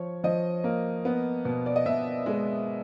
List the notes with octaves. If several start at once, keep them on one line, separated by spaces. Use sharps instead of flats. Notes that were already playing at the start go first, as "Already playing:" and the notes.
Already playing: F3 C#5
F3 D#5
A#3
B3
B2
D5
D#5
B2 E5
G#3